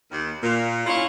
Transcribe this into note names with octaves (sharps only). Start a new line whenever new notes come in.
D#2
A#2
G#2 C#4 E4 F4 C#5